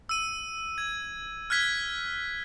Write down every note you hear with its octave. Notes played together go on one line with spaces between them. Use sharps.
E6 D#7
G#6
F6 F#6 G#6 B6